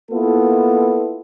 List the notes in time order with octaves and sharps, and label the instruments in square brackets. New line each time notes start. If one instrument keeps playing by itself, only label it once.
[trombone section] A#3 B3 E4 F4 A4